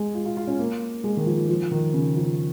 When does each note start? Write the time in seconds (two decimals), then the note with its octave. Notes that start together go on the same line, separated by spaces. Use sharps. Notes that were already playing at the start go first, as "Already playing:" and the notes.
Already playing: G#3
0.14 F4
0.25 F4
0.37 F4
0.47 C#4
0.59 A#3
1.04 G#3
1.17 D#3
1.26 F3
1.49 F3
1.72 D#3
1.93 C#3
2.16 F3